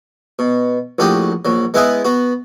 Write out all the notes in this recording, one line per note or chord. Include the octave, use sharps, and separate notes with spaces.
B2
A#1 A2 F#4 G4 D#6
A#1 F#3
G#3 B3 E4 B4 D#5 G#5
B3 F#4